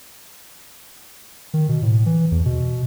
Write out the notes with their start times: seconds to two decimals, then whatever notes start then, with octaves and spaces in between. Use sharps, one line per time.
1.54 D#3
1.69 B2
1.82 A2
2.06 E3
2.32 E2
2.45 B2